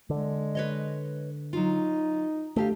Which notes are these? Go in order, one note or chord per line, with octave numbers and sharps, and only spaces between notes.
D3 G#3
B4 C#5 D#5
F#3 D#4 F4
D2 A3 G4 F5